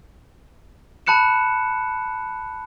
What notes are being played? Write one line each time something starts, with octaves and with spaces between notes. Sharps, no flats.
A5 B5 F#6 C#7 E7